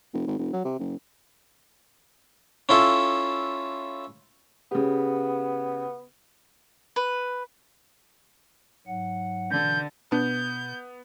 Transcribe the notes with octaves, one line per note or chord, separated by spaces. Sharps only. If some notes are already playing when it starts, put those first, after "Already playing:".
F1
G#1
F1
F#3
C3
F#1
C#4 E4 F4 A4
C#3 B3 G4
B4
G#2 F#3 F#5
B2 D3 E3 G6
B2 B3 D4 G6